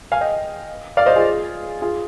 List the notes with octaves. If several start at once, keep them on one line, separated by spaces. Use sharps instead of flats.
F5 G#5
D#5 G5
D5 F5
C5 D#5
F4 G#4
F4 G#4